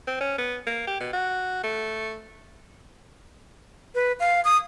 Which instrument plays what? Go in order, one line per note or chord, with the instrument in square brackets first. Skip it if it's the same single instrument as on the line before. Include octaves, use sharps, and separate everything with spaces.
[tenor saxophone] C4
C#4
B3
A#3
G4
B2
F#4
A3
[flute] B4
F5
D#6